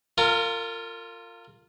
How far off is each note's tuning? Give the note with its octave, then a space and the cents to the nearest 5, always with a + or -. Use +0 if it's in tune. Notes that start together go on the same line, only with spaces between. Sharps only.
F4 +0 A#4 -35